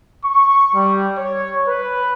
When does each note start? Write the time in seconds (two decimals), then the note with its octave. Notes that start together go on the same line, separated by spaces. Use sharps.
0.23 C#6
0.74 G3
1.17 C#5
1.66 B4